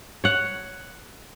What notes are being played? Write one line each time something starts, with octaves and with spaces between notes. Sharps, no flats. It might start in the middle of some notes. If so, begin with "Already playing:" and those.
C#5 F#5